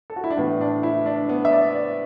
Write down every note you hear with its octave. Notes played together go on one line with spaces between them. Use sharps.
A4
F#4
E4
D4
A2 E3 B3
D4
E4
D4
B3
E5
D5
D5